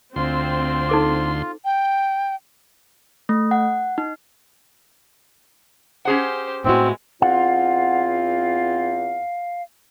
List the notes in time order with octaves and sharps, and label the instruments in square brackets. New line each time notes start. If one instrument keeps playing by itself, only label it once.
[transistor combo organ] D2 C6 [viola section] C4 [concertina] F4
[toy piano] D#4 A4 D6
[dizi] G5
[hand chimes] A3
F#5
D#4
[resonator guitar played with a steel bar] C#4 G#4 F#5 [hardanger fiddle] G4 C5
[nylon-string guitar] A2 E4 F#4 [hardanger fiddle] G#3 B3 [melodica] C4
[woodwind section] E2 C4 F4 [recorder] F5 [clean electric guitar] F#5